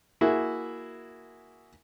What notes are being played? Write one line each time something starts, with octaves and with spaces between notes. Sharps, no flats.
A#3 E4 F#4 G#4